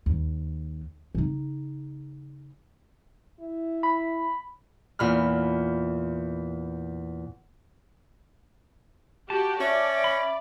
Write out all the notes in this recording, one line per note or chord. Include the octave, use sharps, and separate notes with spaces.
D#2
C#3 D#4
E4
B5
E2 A#2 B5 F6
F#4 G4 A5
C#4 D5 E5
B5